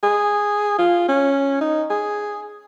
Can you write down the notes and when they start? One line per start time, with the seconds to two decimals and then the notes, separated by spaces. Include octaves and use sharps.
0.03 G#4
0.78 F4
1.09 C#4
1.61 D#4
1.90 G#4